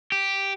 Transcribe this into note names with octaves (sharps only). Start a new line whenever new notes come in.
G4